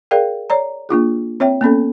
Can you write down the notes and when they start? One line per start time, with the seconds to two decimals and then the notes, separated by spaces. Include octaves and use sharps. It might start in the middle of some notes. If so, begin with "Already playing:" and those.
0.11 G#4 A#4 D5 F5 G5
0.50 C#5 D5 A#5
0.89 A#3 D4 F4 G#4
1.40 C4 C#5 E5 G5
1.61 A#3 B3 C#4 A4